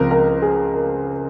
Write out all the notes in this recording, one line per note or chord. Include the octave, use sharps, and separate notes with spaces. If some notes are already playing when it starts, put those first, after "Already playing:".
Already playing: C#2 C#3 F3 C4 A#4
A#4
G#4
A#4